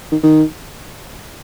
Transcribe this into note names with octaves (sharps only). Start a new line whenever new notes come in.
D#3
D#3